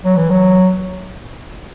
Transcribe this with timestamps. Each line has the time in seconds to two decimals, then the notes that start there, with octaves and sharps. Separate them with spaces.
0.04 F#3
0.16 E3
0.30 F#3